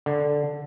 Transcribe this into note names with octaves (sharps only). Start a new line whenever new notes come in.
D3